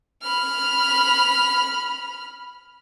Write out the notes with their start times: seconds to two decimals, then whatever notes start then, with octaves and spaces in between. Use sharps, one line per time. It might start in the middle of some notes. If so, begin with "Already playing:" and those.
0.23 B5 F6